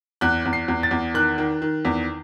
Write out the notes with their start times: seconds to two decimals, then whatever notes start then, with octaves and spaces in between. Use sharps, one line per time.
0.21 E2 F#6
0.45 E2
0.53 C7
0.68 E2
0.83 A6
0.91 E2
1.14 D#3 F#6
1.38 D#3
1.62 D#3
1.85 E2